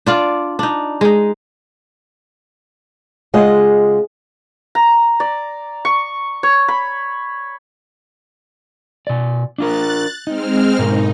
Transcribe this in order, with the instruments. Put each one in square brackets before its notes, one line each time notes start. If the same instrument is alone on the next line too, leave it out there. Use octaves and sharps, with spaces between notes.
[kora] D4 F4 D5
D4 D#4
G#3 D#4
[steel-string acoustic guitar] C#3 G#3 F4 D#5 F#5
[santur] A#5
D5
C#6
C#5
B5
[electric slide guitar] B2 D5
[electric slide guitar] D4 F4 A#4 [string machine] F#6 A6
[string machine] G#3 C4 F6 [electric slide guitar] D#4
[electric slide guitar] G#2 B2 A#4 [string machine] D#4